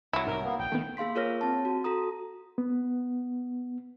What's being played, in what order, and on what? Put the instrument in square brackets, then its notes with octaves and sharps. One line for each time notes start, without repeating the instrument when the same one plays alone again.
[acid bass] C2 [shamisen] F#3 E4
[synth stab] G#2 [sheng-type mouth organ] A#4
[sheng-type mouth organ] A#3 B3
[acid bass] A#1 [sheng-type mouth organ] G5
[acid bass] D#3 [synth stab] A3 B3
[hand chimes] A#3 G#4 F5 C6 B6
F4 G#4 A#4 C#5 F6 A#6
C4 A5
F#4
F#4 A4 A#5 D#6
[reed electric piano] B3